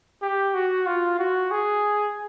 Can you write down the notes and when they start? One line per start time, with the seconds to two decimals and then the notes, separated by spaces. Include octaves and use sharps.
0.22 G4
0.54 F#4
0.87 F4
1.19 F#4
1.51 G#4